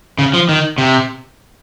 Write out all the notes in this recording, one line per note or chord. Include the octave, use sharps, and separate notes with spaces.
C#3
F3
D#3
C3